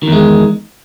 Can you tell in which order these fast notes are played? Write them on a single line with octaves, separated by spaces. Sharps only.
D#3 E2 G#3